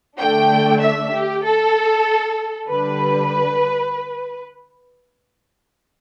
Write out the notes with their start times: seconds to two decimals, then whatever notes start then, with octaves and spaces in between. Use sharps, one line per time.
0.19 D3 A3 D4 G5
0.82 E5
1.13 G4
1.45 A4
2.69 D3 G3 D4 B4